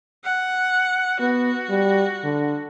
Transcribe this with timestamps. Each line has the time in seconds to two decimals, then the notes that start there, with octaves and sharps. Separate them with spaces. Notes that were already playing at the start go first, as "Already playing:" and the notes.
0.24 F#5
1.20 B3 F#4
1.70 G3
2.24 D3